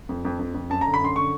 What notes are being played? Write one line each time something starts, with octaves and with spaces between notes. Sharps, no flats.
F2
F2
F2
F2
F#2 A5
D3 A#5
B5
F#2 C6
D3 C#6